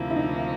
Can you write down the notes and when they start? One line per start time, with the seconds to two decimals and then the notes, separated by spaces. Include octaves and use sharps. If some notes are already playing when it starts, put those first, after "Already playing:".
Already playing: D2 C3 F3 A#3 E4
0.10 E4
0.16 D#4